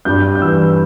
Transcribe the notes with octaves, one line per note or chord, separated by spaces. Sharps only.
G2 G6
G6
E3 E6